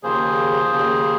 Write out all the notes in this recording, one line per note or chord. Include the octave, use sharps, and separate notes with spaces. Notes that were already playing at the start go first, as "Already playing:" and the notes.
D#2 C#3 F3 A#3 G#4 C5
D#2 C#3 F3 A#3